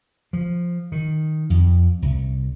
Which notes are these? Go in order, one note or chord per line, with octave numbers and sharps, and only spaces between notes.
F3
D#3
F2
C2